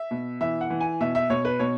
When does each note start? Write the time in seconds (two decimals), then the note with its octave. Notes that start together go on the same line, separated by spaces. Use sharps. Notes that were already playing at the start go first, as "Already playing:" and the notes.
Already playing: E5
0.11 B2
0.41 E3 E5
0.61 F#5
0.70 E3
0.80 G#5
1.01 B2 E5
1.15 E5
1.30 B2 C#5
1.45 B4
1.59 B2 C#5